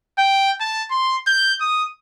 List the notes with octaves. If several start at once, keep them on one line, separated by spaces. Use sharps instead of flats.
G5
A5
C6
G6
D#6